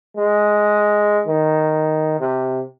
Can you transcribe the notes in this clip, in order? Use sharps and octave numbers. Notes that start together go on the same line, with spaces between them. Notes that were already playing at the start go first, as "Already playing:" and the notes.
G#3
D#3
C3